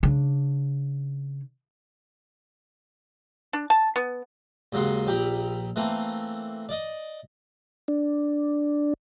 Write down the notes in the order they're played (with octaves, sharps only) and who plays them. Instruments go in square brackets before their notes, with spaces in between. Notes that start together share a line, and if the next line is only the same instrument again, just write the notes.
[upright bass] C#3 D4
[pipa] D4
A5
B3
[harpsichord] D#2 G#2 C#3 F#3 C6
A#1 G4 G5 A#5 B5
E3 A3 A#3 C4
D5 D#5
[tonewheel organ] D4